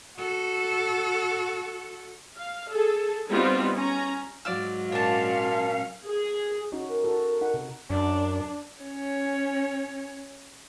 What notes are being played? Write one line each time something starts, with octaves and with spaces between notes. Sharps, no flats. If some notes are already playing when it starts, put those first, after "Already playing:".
F#4 A4
F5
G#4 A4
G3 B3 C4 D#4 F4
C#4 A#5
G#2 F#3 D5 F5 E6
A#2 C#4 D4 F5 A5
G#4
C#4 D#4 F#4
A#4
F#4 A4
D#4 F#5
C3
F#2 D4
C#4 C#5